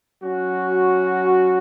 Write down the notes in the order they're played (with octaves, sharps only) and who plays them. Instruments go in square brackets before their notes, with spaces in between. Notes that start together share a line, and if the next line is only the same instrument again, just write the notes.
[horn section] F#3 C#4 F#4